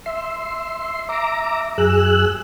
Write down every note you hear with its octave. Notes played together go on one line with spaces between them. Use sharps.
E5 C6
E5 A#5 D6
F#2 G#4 E6 F#6